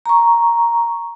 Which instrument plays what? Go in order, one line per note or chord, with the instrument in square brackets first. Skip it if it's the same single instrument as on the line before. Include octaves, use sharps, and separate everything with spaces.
[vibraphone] A#5 C#6